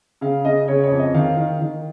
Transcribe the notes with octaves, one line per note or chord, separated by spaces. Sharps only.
C#3 F5
C#3 D#5
C#3 C#5
C#5
F2
D#5
D#3 F5
D#3
D#3